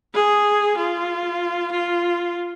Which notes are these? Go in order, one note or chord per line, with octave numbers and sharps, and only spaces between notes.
G#4
F4
F4